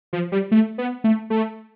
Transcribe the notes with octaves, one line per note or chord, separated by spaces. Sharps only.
F3
G3
A3
B3
A3
A3